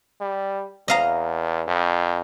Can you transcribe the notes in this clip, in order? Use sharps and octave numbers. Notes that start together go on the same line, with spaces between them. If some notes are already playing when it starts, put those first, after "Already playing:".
G3
E2 D#5 F5 A#5
F2